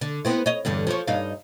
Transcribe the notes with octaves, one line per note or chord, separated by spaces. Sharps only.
D3
B3 C4 E4
C#5 D#5
E2 G2 D3
F3 C#5
G2 D#4 F5